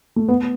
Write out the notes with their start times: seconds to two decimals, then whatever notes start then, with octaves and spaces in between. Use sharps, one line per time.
0.16 A3
0.28 B3